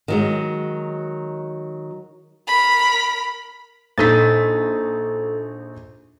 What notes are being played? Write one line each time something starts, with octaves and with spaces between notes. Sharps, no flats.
D#3 F#3 G#3
A#4 B5
A#1 D#4 A4 A6 B6